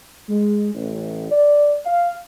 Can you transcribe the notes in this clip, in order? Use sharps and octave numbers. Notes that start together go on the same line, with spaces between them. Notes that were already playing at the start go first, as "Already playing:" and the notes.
G#3
A1
D5
F5